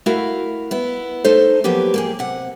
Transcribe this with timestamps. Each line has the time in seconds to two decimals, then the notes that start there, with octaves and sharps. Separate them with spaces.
0.06 A3 E4 F#4 A#4 E5 F5
0.71 B3 E4
1.24 A3 D#4 A4 C5
1.64 F3 F#3 A#3 B3 G4
1.94 A#3 G4 G#4
2.19 C3 F#5